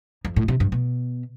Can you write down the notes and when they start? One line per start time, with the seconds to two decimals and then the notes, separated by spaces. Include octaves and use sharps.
0.25 F2
0.36 A2
0.48 C3
0.60 G2
0.72 B2